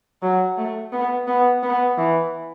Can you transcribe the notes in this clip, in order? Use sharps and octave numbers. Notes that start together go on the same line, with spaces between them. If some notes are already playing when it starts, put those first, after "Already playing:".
F#3
A3
B3
B3
B3
E3